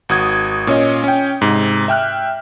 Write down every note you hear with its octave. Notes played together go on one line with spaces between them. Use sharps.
G#1 F#4 D#6 G#6
A#2 C#4 C#5 D#5
C#4 G5
G#2 C3
E5 G5 F6 F#6